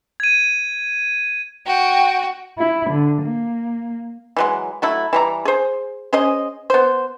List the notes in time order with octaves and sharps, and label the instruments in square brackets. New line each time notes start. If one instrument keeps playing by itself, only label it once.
[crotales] G#6 D#7
[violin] F#4 [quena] G5
[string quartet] E4
D3
A#3
[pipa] E3 F#3 G#3
F#3 A3 E4
E3 G3 A#5
G#4 C5
C#4 G#4 C5 D#5
B3 C5